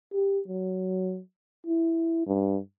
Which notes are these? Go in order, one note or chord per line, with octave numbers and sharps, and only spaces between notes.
G4
F#3
E4
G2